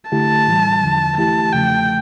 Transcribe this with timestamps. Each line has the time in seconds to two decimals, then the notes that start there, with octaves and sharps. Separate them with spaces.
0.11 D3 A3 E4 G4 A5
0.47 A2 E3 G3
0.83 E2 D3 F3
1.18 E3 A3 E4 G4 A5
1.53 E2 C#3 F3 A3 G5